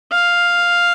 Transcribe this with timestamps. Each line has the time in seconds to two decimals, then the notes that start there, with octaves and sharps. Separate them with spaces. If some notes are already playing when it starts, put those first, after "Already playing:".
0.12 F5